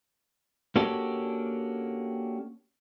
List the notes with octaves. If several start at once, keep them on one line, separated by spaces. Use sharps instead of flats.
A#3 C#4 D4 F#4 G4 A4